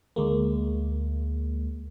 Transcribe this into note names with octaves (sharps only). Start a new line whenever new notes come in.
D2 G#3 A#3